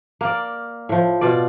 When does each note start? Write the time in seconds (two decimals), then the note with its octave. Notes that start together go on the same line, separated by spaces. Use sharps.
0.21 A#3 A#4 D5
0.89 A2 F3
1.21 B2 F4 D5